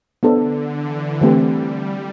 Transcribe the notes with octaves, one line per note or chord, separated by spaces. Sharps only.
D3 B3 D4 A4 C5
E3
E3 G3 A3 C4 G4 B4